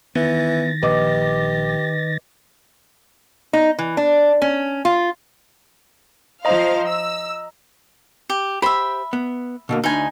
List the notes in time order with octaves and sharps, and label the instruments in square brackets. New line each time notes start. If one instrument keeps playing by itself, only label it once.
[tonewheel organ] D#3 A6 A#6 [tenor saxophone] E3 [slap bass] B3
[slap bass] A#1 [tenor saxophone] G4 [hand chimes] B4 D#5 D6
[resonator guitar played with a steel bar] D#4
E3
D4
C#4
F4
[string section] F3 C5 F5 [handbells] D#5 A#5
[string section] E6
[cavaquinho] G4
[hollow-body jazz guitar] G4 C5 [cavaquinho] E5 B5
[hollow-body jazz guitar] B3
B2 D3 A#3
[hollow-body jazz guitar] D2 D4 B5 [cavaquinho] D#4 G#5